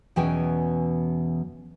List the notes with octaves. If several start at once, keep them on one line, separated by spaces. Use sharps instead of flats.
E2 B2 E3 C#4 G5 G#5